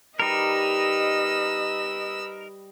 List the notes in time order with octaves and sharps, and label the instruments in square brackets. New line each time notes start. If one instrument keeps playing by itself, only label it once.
[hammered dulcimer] G3 [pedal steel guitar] D#4 A#4 [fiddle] B4 E6 [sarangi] D#5